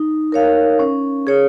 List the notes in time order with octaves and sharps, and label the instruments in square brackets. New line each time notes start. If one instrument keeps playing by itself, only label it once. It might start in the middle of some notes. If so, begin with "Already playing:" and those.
Already playing: [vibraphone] D#4
A#4 C#5 F5
C#4
G#4 C#5